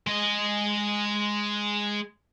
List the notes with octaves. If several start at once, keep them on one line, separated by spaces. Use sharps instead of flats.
G#3 D#5